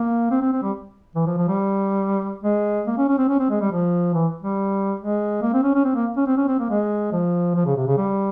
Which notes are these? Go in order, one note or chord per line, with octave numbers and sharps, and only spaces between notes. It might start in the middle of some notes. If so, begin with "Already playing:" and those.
Already playing: A#3
C4
C4
C4
G3
E3
F3
F3
G3
G#3
A#3
C#4
C#4
C4
C#4
C4
G#3
G3
F3
E3
G3
G#3
A#3
C4
C#4
C#4
C4
A#3
C#4
C4
C#4
C4
A#3
G#3
F3
F3
C#3
C3
C#3
G3